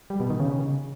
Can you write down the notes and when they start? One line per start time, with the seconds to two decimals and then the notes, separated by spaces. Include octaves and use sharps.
0.10 G3
0.20 B2
0.30 D#3
0.40 C#3